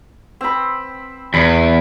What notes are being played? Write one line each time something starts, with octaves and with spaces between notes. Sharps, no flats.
C4 B5
E2 B5